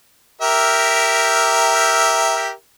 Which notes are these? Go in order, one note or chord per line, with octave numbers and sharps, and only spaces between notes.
G4 A#4 E5